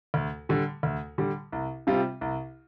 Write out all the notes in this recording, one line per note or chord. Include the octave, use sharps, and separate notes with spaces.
D2
D3 G3
D2
D3 G3
C2
C3 G3 C4 F4
C2